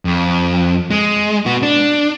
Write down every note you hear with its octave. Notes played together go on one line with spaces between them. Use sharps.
F2
G#3
B3 F#4
D4